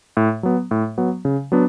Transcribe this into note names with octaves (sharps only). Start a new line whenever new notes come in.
A2
F#3 B3
A2
F#3 B3
C#3
F#3 B3 D4